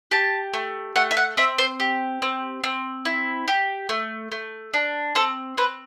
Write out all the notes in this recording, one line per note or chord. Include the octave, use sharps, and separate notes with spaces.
G4 A5
A3
A3 F#5
E5
F#5
C4 E5
C5
G4
C4
C4
E4
G4
A3
A3
D4
C4 A4
C4 B4